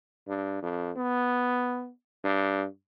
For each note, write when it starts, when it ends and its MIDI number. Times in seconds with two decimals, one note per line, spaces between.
0.28 0.58 43
0.62 0.91 41
0.97 1.91 59
2.24 2.66 43